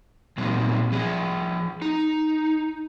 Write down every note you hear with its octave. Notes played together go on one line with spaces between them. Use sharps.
A#2 F#3 C4 D#4
F3 G#4
D#4